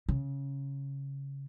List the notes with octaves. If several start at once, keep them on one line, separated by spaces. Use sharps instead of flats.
C#3